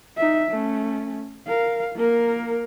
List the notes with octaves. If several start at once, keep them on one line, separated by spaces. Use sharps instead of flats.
D#4 E5
A3 C#4
A#4 F5
A#3 A#4